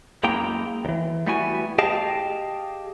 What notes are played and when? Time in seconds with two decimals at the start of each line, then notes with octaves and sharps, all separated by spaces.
0.24 F#2 G#3 A#3 E4 G5 A#5
0.85 D#2 E3
1.27 G3 A3 B3 E4 F#4 G#5
1.78 G4 G#4 D#5 F5 G5 A5